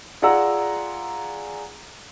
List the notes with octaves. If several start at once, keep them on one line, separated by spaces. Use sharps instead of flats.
F4 G#4 D5 F#5 A#5 E6